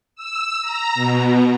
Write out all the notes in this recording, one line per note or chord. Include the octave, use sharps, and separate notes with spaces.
E6
A#5
B2